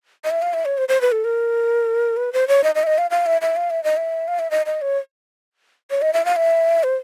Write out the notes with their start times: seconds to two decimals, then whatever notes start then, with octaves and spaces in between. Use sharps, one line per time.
0.24 D#5
0.31 E5
0.42 F5
0.54 E5
0.65 C#5
0.78 C5
0.89 C5
1.01 B4
1.12 A4
1.24 A#4
2.17 B4
2.33 C5
2.48 C#5
2.64 D#5
2.75 D#5
2.83 E5
2.87 D#5
2.98 F5
3.11 F5
3.26 E5
3.42 E5
3.56 F5
3.70 E5
3.84 D#5
3.97 E5
4.28 F5
4.39 E5
4.51 D#5
4.66 D#5
4.82 C#5
5.91 C#5
6.02 D#5
6.13 E5
6.25 F5
6.36 E5
6.83 C5